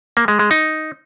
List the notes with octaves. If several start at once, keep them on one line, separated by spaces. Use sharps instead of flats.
A#3
G#3
G#3
D#4